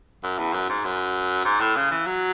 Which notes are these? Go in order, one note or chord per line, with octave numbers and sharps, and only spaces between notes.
F#2
E2
F#2
G#2
F#2
G#2
A2
C#3
E3
F#3